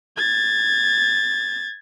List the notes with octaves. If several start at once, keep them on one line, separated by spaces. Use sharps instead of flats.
G#6 A6